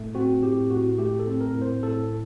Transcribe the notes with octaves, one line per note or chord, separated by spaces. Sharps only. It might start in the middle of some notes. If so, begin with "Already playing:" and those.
Already playing: A2 A3
C4 F#4
A2 G4
A2 F#4
A3 G4
A4
C4
A#4
A2
C5
A2 A4